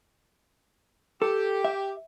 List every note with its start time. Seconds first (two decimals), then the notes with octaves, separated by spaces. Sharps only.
1.22 G4 A4
1.65 E5